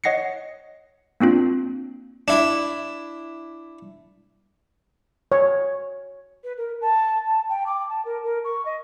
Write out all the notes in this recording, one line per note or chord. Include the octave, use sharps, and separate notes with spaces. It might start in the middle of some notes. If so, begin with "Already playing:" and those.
C#5 D#5 F#5 A#6 C7 C#7
A#3 C4 D4 F4
D4 E4
C#5
B4
A#4
A5
A5
G5
D6
A5
A#4
A#4
C#6
D#5